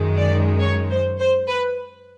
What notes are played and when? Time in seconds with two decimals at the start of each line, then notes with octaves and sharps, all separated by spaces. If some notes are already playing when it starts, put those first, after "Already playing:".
Already playing: F#2 D#3 G#3
0.17 D5
0.60 C#5
0.89 C5
1.18 C5
1.48 B4